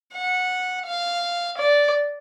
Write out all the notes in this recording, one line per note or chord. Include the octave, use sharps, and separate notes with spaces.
F#5
F5
D5